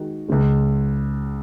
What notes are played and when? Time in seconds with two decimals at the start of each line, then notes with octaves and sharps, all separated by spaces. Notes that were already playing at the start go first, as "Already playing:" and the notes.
Already playing: D#3 G#3 D#4 F#4
0.28 C#2 C#3 G#3